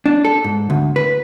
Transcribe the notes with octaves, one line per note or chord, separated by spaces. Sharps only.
D4
A4
G#2
D2
B4